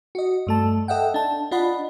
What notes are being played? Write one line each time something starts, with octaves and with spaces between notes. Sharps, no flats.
F#4 D#5
G2 A3 A5
A4 D#5 E5 F#5 G5
D4 A5
D4 F4 D#5 F#5 B5